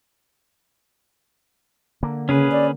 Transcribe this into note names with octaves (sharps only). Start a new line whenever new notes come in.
D3 A#3
C#3 C#4 G#4 B4
D5